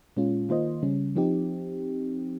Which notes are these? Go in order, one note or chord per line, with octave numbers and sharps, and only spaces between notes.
A#2 G#3 C#4 F4
D#3 A#3 F4 C5 D#5
C#3 G3 C#4
F3 C4 D#4 G4